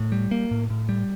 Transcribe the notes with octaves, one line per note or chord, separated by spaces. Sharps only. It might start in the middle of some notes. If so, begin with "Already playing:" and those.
Already playing: A2
G3
A#3
A2
A2
G3